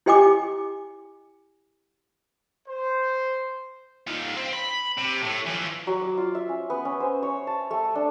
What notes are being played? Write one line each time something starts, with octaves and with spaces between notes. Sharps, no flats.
E4 G4 D#5 G5 G#5 D6
C5
D#4 F4
C4
B5
C3
A2
E3 F3
F#3
D6
F4
E5
C#4
B3
C#4
C5
C#5
A5
A3
D4